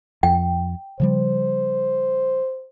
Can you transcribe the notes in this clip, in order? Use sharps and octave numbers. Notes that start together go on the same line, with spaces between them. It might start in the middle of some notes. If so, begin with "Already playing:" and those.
F2 G5
C#3 F3 G3 C5